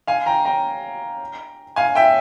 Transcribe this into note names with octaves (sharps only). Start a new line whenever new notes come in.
F5 G#5
G5 A#5
G5 A#5
F5 G#5
E5 G5